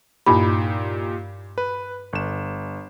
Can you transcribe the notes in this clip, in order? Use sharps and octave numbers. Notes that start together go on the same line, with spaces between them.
G2 A#2 D#4 G4 B5
B4
G1 E7